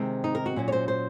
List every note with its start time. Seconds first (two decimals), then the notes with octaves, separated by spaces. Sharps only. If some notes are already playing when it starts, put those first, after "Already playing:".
Already playing: C3 D#3 G#3 C4
0.24 D#4
0.35 A#4
0.46 F#4
0.56 A#2 F#3 C#4
0.68 C#5
0.72 C5
0.88 C5